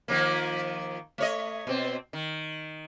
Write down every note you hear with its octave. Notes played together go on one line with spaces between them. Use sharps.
D#3 F3 A#3
A3 C#5 D#5
B2 C4
D#3